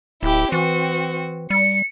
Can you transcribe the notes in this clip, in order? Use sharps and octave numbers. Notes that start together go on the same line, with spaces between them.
D1 E4 G4
E3 C4 F#4
G3 C#7